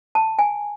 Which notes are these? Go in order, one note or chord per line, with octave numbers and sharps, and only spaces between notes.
A5
G#5